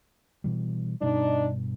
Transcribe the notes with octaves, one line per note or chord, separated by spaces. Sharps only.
B2 E3 G3
G2 B2 G3 D4 D#4